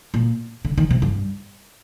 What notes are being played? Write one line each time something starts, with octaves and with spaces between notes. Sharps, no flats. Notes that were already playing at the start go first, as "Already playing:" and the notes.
A#2
D3
D#3
C3
G2